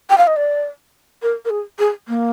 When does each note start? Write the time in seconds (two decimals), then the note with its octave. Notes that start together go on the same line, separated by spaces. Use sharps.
0.10 G5
0.18 F5
0.27 D#5
0.36 D5
1.22 A#4
1.45 A#4
1.50 G#4
1.79 G#4
2.08 A#3